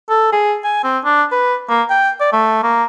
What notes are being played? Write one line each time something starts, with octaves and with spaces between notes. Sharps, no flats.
A4
G#4
G#5
C4
D4
B4
A#3
G5
D5
A3
A#3